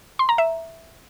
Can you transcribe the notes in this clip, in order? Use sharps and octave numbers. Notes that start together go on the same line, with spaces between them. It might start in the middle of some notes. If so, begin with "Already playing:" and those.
C6
A#5
E5